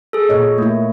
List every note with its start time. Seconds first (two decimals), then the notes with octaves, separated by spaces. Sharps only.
0.13 G#4 A4
0.29 A#2 C#5 D#5
0.58 A3 A#3 E4